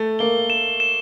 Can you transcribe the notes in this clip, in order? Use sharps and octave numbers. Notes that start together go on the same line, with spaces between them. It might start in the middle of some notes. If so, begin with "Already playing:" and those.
Already playing: A3
A#3 G7
E7
E7